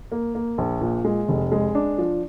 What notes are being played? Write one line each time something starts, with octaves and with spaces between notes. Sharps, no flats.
A#3
A#3
A#1
A#2
G#3
F1
G#3
D4
F3